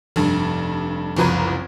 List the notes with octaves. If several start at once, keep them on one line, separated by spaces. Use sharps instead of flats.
F1 G2
F#1 C2 F3 B4 A#5 G#6